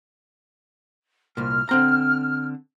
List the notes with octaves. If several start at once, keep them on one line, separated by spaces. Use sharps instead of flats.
C2 A#2 F6
D3 C4 A#5